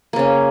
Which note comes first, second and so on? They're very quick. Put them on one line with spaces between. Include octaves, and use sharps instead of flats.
A#3 C#3 C#4